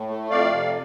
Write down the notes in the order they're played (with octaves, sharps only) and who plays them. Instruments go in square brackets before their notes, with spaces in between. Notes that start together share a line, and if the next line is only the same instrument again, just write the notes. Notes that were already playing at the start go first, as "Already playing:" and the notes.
Already playing: [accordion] A2
A3
F2 D5 F5
C3